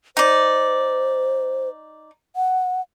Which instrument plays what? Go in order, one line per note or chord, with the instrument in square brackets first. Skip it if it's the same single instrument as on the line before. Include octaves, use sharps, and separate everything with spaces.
[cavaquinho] D#4 D5 [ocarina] C5
[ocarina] F#5